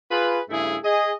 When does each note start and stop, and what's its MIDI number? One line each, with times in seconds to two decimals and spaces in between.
0.11 0.40 65
0.11 0.40 68
0.11 0.40 71
0.50 0.76 43
0.50 0.76 49
0.50 0.76 57
0.50 0.76 64
0.50 0.76 68
0.84 1.13 68
0.84 1.13 75